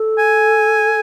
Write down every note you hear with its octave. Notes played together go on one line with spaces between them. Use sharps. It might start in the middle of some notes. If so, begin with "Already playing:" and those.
Already playing: A4
G#5